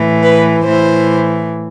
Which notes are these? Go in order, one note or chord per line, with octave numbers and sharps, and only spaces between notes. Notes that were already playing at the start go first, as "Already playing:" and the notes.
Already playing: A2 E3
B4
A2 E3 C5